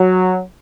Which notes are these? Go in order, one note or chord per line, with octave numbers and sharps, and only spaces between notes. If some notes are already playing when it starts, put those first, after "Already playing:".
Already playing: F#3